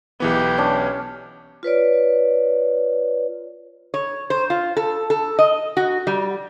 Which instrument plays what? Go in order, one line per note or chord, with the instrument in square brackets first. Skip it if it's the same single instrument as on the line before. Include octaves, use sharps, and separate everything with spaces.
[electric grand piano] B1 E3 B3 [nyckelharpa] G4
[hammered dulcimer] C#4 D4
[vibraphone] F4 B4 C#5 D5
[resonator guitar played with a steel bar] C#5
C5
F4
A4
A4
D#5
F#4
G3